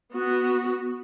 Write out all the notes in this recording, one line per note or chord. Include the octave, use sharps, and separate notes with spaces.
B3 F#4